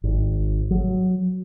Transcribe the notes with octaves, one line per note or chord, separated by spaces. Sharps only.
G#1
F#3